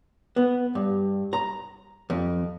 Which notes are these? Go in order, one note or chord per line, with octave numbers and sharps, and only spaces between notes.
B3
G2
A#5
F2